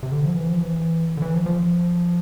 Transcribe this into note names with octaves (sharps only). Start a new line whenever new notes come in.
C3
D3
F3
E3
F3
E3
D3
E3
F3
F3